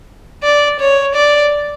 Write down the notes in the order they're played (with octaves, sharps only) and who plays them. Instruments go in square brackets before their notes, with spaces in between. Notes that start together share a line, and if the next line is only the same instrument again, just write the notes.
[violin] D5
C#5
D5